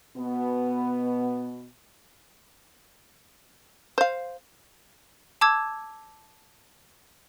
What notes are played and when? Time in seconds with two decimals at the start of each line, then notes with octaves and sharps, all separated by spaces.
0.17 B2 B3
3.98 C5 F5
5.41 A5 D6 E6 G#6